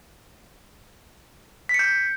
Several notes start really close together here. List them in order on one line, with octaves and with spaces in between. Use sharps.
B6 C#7 G6